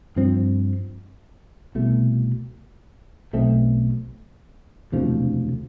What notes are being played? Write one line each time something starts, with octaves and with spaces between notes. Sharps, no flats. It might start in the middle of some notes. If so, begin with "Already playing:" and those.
G2 F3 C4
C2 B2 A3
B1 B2 A3 C4
E1 D2 C3 F3